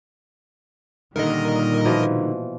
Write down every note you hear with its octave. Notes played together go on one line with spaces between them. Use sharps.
A#2 D3 D#3 G3 D#4 A#4 D#5
B2 E3 F3